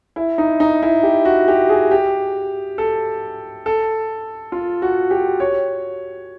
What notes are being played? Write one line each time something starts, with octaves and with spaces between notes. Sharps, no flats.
E4
D#4
D#4
E4
G4
F#4
G4
G#4
G4
A4
A4
F4
F#4
G4
C#5